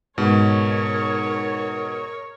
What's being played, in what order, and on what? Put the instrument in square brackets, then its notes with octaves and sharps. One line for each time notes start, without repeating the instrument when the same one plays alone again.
[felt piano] G#2 [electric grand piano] B2 [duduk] A#4 [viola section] C#5